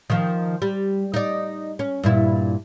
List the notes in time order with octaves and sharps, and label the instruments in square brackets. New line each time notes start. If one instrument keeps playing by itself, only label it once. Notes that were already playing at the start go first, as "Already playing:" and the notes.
[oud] D#3 F3
G3
D#4 D5
C#4
G2 A#2 E4